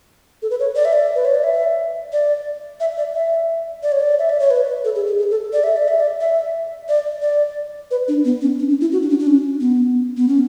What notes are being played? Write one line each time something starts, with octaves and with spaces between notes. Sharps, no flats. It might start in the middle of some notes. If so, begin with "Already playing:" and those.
A4
B4
C#5
D5
E5
D5
B4
C#5
D5
E5
D5
E5
D5
E5
D5
C#5
D5
E5
D5
C#5
B4
A4
G#4
G#4
G#4
A4
D5
E5
D5
E5
D5
E5
D5
D5
B4
D4
B3
C#4
D4
C#4
E4
F#4
D4
C#4
D4
C#4
B3
B3
C#4